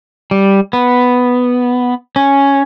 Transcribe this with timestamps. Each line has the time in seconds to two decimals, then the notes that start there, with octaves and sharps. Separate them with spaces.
0.31 G3
0.73 B3
2.16 C#4